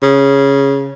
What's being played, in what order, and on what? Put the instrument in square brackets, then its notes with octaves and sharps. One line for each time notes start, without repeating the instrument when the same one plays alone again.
[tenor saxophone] C#3